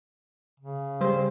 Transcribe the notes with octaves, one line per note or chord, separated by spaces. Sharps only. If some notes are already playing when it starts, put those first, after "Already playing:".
C#3
G3 C5